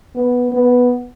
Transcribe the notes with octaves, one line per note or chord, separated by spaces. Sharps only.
B3
B3